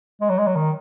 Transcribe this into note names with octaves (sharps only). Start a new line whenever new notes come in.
G#3
F#3
G#3
F#3
D#3